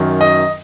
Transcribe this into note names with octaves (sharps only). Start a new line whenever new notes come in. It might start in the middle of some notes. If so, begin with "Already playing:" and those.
Already playing: F#2 D#3 F#3
D#5